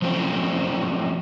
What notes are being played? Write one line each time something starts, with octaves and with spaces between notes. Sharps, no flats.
F3 F#3 A3 C4 C#4 C5